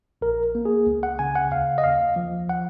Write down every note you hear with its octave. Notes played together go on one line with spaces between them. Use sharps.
A#1 A#4
A#3
G#4
C#2
F#5
C#3 G#5
F#5
D#2 F5
D#5
D#2 F5
F3
F#5